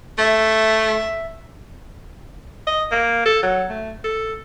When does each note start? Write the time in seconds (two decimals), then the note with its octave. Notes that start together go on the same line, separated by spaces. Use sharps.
0.18 A3 E5
2.67 D#5
2.91 A#3
3.25 A4
3.43 F#3
3.70 A3
4.04 A4